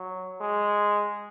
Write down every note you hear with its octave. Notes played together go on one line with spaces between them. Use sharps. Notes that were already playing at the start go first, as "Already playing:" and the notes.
Already playing: F#3
G#3